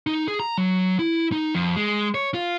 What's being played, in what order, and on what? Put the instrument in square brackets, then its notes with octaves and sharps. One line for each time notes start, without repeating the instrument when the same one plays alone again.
[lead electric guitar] D#4
G#4
A#5
F#3
E4
D#4
F2
G#3
C#5
F4